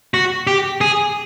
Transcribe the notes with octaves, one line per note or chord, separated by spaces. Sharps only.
F#4
G4
G#4